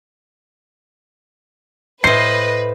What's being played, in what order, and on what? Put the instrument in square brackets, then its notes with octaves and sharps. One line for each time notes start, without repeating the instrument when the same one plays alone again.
[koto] A2 C5 [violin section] B4 [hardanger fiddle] D#5 [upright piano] C7